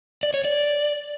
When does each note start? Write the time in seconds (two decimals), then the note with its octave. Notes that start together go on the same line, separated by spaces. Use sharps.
0.23 D5
0.34 C#5
0.45 D5